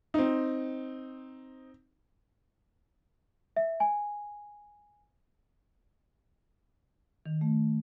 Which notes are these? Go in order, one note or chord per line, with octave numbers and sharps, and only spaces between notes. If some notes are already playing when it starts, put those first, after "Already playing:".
C4 D#4
E5
G#5
D#3
A3